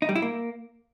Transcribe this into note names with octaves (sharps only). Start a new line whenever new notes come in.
D#4
G3
E4
A#3